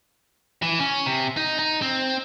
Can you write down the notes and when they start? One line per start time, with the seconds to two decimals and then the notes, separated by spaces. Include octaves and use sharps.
0.62 E3
0.79 C#4
1.06 C3
1.37 D#4
1.59 D#4
1.82 C4